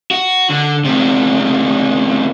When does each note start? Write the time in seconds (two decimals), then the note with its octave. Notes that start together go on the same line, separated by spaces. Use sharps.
0.11 F#4
0.50 D3
0.84 E2 C3